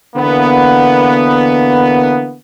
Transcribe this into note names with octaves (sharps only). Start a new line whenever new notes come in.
D3 E3 A#3 B3